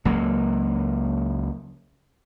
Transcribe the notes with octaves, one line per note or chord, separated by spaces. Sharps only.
C#2 F#3 A#3